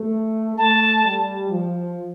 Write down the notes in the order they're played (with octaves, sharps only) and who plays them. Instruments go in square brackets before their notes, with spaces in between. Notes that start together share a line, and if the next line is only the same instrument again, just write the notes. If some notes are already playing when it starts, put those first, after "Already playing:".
Already playing: [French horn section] A3
[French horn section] A3 [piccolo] A5
[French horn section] G3
F3